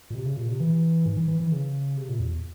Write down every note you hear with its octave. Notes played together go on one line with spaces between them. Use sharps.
A#2
C3
C#3
A#2
C3
E3
G#2
E3
E3
E3
C#3
C3
A#2
E2